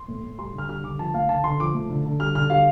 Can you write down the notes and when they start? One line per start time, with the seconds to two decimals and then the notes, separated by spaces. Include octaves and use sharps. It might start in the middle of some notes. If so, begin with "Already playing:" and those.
Already playing: C6
0.08 A2
0.24 A2
0.38 G3 C6
0.54 D3 F6
0.69 G3 F6
0.84 D3 D6
0.99 F3 A5
1.14 A3 F5
1.29 D3 A5
1.44 D3 C6
1.60 F3 D6
1.74 A3
1.90 D3
2.05 D3
2.20 G3 F6
2.35 D3 F6
2.50 G3 F5